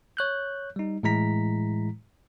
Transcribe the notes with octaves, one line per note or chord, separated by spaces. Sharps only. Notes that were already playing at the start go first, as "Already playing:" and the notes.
C#5 F#6 G6
G3 D#4
A2 E3 G#3 E4 A#5 B6